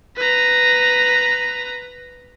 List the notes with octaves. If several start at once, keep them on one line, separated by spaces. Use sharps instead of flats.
B4 A#5